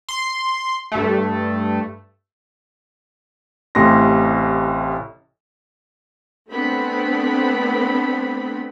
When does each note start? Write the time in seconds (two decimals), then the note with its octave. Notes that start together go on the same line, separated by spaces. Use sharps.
0.09 C6
0.92 G2 A3
3.75 A1 A2 C3 C6 A#6
6.50 A3 B3 C4 D4 B5